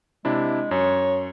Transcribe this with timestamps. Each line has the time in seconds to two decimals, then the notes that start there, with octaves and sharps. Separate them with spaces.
0.25 C3 G#3 D4 E4
0.71 F#2 C#5